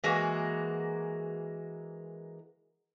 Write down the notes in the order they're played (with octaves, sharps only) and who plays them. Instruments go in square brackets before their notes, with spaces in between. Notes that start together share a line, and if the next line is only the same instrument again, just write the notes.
[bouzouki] E3 G#3 A#3 F#4